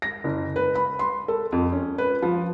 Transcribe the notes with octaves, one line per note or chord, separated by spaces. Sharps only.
A#6
F#1
B4
B5
C6
A4
F2
C#4
B4
F3